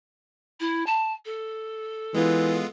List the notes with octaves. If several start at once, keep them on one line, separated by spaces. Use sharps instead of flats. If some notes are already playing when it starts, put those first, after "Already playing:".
E4
A5
A4
E3 G#3 B3 F4